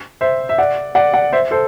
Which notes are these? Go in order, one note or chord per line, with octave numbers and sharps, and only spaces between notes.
C5 E5
E5
D5 F#5
D5 F#5
D5 F#5
C5 E5
A4 C5